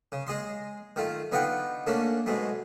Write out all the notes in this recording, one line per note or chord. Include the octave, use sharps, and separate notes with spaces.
C#3
G#3 G#4 D#5 C6
D#3 A3 F4
D3 B3 D#4 F4 F#5 G5
D3 A3 A#3 C#4 D4
G#2 B2 G#3 A3